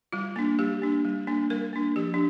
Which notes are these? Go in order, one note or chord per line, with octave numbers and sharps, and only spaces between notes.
G3 F4
A#3 D4
G3 G4
A#3 D4
G3
A#3 D4
G3 A#4
A#3 D4
F3 G4
D4